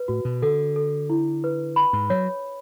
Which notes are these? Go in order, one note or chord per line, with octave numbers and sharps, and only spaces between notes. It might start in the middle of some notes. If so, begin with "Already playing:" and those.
Already playing: B4
A2 F#4
B2
D3 A4
A4
E4
B4
B5
G#2
F#3 C#5